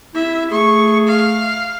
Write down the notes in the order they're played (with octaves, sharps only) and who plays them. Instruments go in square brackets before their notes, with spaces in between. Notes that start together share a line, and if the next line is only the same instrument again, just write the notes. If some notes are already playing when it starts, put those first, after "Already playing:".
[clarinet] E4 [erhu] E5
[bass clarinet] A3 [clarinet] G#4 [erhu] C#6
[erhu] F5